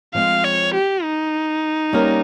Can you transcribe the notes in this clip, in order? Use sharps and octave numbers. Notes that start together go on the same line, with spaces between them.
F3 G#3 C4 F5
C#5
G4
D#4
G3 A#3 C#4 G4 A#4